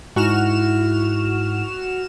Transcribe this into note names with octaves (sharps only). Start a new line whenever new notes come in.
G#2 E4 F#4 F6 E7